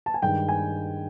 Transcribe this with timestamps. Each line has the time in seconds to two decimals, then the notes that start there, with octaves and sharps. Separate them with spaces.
0.06 A5
0.14 G#5
0.22 G2 D#3 G#3 G5
0.49 G#5